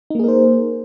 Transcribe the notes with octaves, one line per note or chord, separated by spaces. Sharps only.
A#3 D#4 G#4 A#4 C5